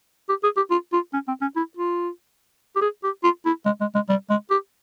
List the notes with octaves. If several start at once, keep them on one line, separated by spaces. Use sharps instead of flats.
G4
G#4
G4
F4
F4
C#4
C4
C#4
E4
F4
G4
G#4
G4
F4
E4
G#3
G#3
G#3
G3
G#3
G4